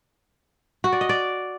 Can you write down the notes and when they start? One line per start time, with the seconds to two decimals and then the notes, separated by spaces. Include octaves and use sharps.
0.84 F#4
0.92 D5
1.01 D#5
1.09 D5